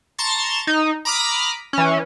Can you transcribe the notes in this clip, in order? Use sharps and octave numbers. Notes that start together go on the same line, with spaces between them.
A5 A#5 C6 C#6 A6
D#4
A#5 B5 D6 D#6 F6 B6
E3 C#4